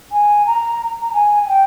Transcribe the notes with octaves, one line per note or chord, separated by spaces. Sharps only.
G#5
A#5
A#5
G#5
G#5
G5